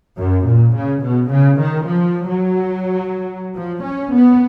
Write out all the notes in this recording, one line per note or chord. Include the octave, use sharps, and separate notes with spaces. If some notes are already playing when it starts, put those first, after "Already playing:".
F#2
A#2
C#3
B2
C#3
D#3
F3
F#3
F3
C#4
B3